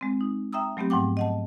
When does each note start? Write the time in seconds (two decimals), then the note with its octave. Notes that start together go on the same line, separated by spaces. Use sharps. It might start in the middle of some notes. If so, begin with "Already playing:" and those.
0.01 G#3 C4
0.21 D#4
0.53 E5 G5 A#5 D#6 E6
0.77 F#3 A3 B3 C4 G4
0.90 G#2 F3 F#5 G5 D6
1.17 D#5 F#5 A5